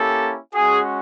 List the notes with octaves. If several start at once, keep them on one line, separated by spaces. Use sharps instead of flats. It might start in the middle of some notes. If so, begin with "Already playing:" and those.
Already playing: A#3 C#4 E4 G4 A4
G#3 C#4 F#4 G#4